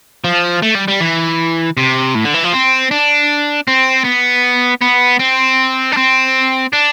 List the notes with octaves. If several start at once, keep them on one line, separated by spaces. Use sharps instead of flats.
F3
A3
G3
G3
E3
C3
A2
D3
E3
F3
C4
D4
C4
B3
B3
C4
D4
C4
D4